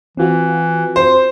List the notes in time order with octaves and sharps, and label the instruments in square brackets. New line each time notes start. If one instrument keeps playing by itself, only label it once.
[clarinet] E3 [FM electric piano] C4 F4 F#4
[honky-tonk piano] C5